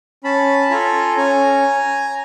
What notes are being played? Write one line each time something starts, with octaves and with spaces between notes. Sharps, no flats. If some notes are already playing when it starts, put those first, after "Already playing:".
C#4 A5 B5
F4 A4 G#5 A#5
C#4 G#5 A#5